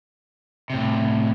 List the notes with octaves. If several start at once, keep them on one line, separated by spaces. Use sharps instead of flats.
A2 C3